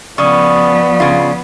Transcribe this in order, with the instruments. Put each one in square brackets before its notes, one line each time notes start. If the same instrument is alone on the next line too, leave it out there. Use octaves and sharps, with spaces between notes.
[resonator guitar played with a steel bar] C#3 [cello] F3 B3 [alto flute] D5 [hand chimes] C#6 D#6
[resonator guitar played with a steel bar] C#3 F4